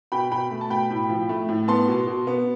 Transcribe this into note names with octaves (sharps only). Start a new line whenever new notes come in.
B2 G5 B5
B2 G5 B5
A3
A5
B2 G5 B5
A2
F3
A3
A2
B3 A5 C6
B2
B2
B3